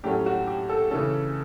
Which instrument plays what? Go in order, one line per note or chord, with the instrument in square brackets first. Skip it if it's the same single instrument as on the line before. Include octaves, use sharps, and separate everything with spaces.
[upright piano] A2 F#3 A3 C#4 G4
F#4
G4
A4
C#3 E3 A3 C#4 A4